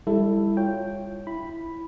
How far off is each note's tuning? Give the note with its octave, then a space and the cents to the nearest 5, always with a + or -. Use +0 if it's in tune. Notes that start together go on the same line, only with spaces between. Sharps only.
G3 +45 E4 +0 A4 +10
F4 +0 C#5 +0 G5 +0
E4 +0 B5 +0